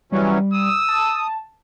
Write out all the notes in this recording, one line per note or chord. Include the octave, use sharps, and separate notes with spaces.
E3 F#3 G3 C#4
D#6 E6
A5